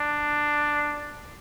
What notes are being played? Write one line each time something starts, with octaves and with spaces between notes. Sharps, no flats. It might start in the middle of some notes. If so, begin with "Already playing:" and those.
Already playing: D4